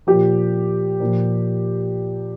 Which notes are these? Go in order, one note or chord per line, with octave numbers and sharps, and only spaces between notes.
A#2 F3 G4
A#2 F3